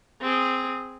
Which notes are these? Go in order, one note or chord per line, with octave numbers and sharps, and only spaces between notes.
C4 G#4